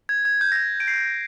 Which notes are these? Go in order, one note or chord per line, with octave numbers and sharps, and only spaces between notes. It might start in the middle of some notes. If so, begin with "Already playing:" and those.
G#6
G#6
G6
A#6
G#6
D7
C7